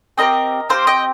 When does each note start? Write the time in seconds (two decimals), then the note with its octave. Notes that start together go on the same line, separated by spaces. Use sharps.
0.18 C4 D#4 G4 A#4 D#5
0.69 C4 D#4 G4 C5 F5
0.87 D#5 G5